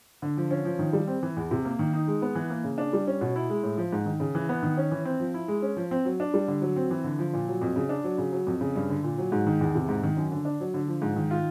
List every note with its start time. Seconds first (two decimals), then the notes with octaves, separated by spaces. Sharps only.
0.22 D3
0.37 F3
0.51 C#4
0.65 F3
0.79 D#3
0.93 G3
1.07 C4
1.23 E3
1.36 E2
1.51 C3
1.65 A#3
1.79 D#3
1.93 D#4
2.07 G#3
2.22 B3
2.35 E3
2.50 A#3
2.64 C#3
2.78 D4
2.93 G3
3.07 C#4
3.21 B2
3.36 E4
3.50 G#3
3.63 A2
3.78 F3
3.92 G#2
4.06 D#3
4.20 C#3
4.35 E3
4.49 B3
4.63 D#3
4.77 C#4
4.92 E3
5.05 C4
5.20 F3
5.34 E4
5.48 G#3
5.62 C#4
5.77 F3
5.91 C4
6.05 F#3
6.20 D4
6.34 G3
6.48 D3
6.62 F#3
6.76 C4
6.91 E3
7.04 D3
7.19 F3
7.33 A#2
7.48 F#3
7.61 F2
7.76 C#3
7.89 D4
8.04 F#3
8.18 C#3
8.33 F#3
8.47 F2
8.61 C#3
8.76 G2
8.89 D3
9.03 A#2
9.18 F#3
9.32 G#2
9.47 D#3
9.61 E2
9.75 C3
9.89 G#2
10.03 D#3
10.17 F#2
10.31 D3
10.45 D4
10.60 F#3
10.74 D3
10.88 F3
11.02 G#2
11.16 D#3
11.31 F4